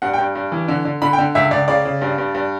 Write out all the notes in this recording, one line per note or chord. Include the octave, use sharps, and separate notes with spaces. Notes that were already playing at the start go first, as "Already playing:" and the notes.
G2 F#5
G5
G2
G2
E3
D3
D3
D3 B5
G5
D3
C#2 E5
C#2 D5
C#3 D5
C#3
G2
G2
G2